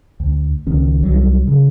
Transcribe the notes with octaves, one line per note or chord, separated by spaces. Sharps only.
D2
C#2 D#3 C#4
C2 F#3 G3
C#3